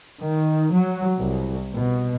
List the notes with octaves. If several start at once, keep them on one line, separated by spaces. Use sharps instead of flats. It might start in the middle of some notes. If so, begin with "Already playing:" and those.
D#3
F#3
C2
B2